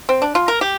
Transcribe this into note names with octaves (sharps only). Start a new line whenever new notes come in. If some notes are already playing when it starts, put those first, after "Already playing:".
C4
D4
F4
A#4
G4